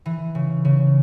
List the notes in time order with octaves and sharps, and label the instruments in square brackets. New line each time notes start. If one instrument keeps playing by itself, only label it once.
[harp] E3
C#3
C#3